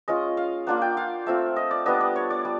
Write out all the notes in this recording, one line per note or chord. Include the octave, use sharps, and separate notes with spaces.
G#3 C#4 F4 D#5
F5
A#3 D4 F4 F#5
G5
F5
A3 C4 F4 E5
D#5
D5
G3 B3 D4 D#5
D5
C#5
D5
G3